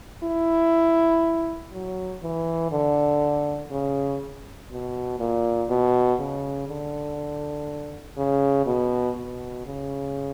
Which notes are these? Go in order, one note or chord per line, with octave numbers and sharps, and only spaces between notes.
E4
F#3
E3
D3
C#3
B2
A#2
B2
C#3
D3
C#3
B2
B2
C#3